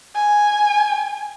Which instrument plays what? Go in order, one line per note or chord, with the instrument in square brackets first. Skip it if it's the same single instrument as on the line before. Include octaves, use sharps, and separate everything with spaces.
[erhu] G#5